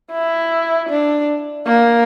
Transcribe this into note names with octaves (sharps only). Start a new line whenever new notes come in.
E4
D4
A#3